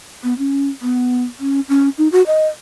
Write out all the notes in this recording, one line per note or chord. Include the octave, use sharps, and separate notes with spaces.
B3
C#4
B3
C#4
C#4
D#4
F#4
D#5